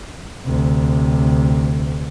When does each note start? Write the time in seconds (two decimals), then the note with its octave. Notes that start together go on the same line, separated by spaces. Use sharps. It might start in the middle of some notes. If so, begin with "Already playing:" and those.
0.46 D2 C3